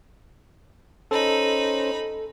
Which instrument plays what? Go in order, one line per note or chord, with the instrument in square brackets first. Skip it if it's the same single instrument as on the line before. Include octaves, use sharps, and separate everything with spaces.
[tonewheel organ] C#4 C5 [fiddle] D#4 B5 [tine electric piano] A4